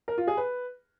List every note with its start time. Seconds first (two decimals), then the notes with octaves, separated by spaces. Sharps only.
0.08 A#4
0.18 F4
0.27 G#4
0.37 B4